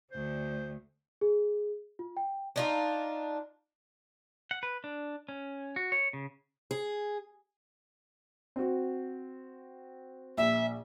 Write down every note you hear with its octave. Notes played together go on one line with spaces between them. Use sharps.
D2 D3 C5
G#4
F4
G5
D4 D#4 F4
F#5
B4
D4
C#4
F#4
C#5
C#3
G#4
C4 F#4
A#1 E5